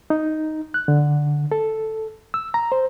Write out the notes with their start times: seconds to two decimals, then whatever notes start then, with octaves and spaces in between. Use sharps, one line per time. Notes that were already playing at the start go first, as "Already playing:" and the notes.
0.10 D#4
0.74 F#6
0.88 D3
1.52 A4
2.34 E6
2.54 A#5
2.72 C5